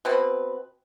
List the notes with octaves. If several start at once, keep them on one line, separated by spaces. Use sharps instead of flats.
B2 C4 B4